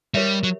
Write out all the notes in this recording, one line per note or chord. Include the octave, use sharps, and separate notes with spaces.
G3 G4 A#4 C#5 E5
F#3